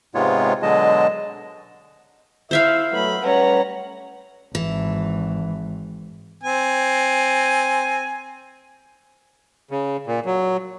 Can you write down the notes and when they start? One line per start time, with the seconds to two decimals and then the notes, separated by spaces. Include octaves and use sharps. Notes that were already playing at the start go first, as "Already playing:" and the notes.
0.15 G#2 C3 G#3 B3 F4 C#5
0.63 B2 D3 F#3 G#3 D#5 A5
2.51 E4 C5 E5 F5
2.92 F#3 A3 B3 B5
3.23 G3 A3 C#4 B4 F#5 A#5
4.55 G#1 E3
6.44 C4 G#5
9.71 C#3
10.07 A#2
10.26 F#3